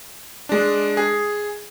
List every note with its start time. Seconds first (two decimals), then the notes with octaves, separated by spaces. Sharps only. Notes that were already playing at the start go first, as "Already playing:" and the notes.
0.49 G#3 D4
0.97 G#4